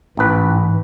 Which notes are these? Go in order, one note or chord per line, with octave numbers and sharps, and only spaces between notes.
A1 G#2 E3 B4